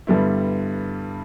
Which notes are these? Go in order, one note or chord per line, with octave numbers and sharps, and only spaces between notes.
G2 D3 G3 B3 E4